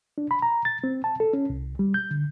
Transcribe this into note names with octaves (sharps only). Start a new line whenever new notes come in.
D4
B5
A#5
A6
C4
A5
A4
C#4
C2
G3
G6
D3